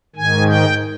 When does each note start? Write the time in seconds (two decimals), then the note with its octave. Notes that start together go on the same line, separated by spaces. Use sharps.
0.16 G#2 D#3 G#5
0.47 G5